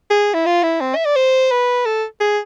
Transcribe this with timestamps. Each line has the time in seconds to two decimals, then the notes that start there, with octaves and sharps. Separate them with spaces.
0.11 G#4
0.34 E4
0.46 F4
0.63 E4
0.81 C4
0.95 E5
1.05 D5
1.16 C5
1.51 B4
1.86 A4
2.20 G#4